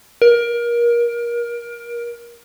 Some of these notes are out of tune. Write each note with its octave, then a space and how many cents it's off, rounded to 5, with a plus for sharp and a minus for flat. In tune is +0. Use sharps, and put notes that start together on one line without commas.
A#4 +25